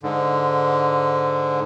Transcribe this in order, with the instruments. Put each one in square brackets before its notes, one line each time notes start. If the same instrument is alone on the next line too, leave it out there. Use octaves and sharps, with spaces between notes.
[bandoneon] G#2 D3